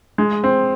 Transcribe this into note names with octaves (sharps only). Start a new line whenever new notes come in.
G#3
C4